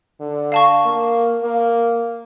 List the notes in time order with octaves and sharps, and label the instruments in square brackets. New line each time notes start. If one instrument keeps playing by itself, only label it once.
[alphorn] D3
[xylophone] F5 A5 C#6
[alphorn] A#3
A#3